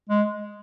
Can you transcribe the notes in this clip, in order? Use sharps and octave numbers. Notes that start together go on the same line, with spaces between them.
G#3